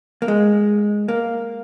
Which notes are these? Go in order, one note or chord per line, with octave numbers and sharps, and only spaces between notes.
A#3
G#3
A#3